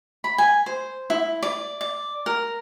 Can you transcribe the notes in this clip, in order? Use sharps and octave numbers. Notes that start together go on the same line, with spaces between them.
B5
G#5
C5
E4
D5
D5
A#4